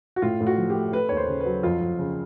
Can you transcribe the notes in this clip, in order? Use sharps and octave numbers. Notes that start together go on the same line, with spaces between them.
F#4
A2 F4
A2
F#4
F3
G4
A3
A3 B4
D#2 C#5
C5
C#3
F#3 B4
F2 F4
F2
C#3